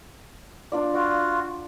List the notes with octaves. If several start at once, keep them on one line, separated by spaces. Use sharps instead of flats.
D4 F4 D5
F4 F#4 D5